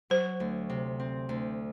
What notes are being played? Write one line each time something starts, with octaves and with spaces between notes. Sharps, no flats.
F#3 C5
D2
C3
C4
D2